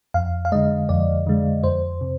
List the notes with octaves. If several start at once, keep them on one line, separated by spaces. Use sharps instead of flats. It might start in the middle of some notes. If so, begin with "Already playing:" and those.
F2 F5
F5
D3 G#3 D#5
F2 D5
D3 G#3
F2 C5
C3